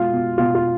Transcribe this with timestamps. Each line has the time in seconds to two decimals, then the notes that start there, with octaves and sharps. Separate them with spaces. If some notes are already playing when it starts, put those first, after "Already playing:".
Already playing: B2 G#3 F4
0.13 B2
0.38 B2 F4
0.55 F4